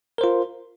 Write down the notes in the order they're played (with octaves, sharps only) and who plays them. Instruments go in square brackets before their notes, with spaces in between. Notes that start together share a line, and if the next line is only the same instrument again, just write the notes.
[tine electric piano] A#4
C5
F4